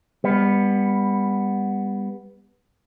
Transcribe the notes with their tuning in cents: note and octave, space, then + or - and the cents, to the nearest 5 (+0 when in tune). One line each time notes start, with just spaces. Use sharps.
G3 +30 B3 +0